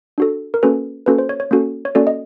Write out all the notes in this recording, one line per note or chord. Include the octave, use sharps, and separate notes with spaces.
D4 F#4 A4
A#4
A#3 C#4 F#4 A4 B4
A#3 C#4 F#4 A4 B4
C5
C#5
C#5
A#3 C#4 F#4 A4
C#5
A#3 C#4 F#4 A4 D5
D#5